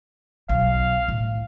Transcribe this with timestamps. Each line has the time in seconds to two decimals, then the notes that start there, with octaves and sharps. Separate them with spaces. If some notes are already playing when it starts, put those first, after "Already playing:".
0.49 B1 F5
1.08 A2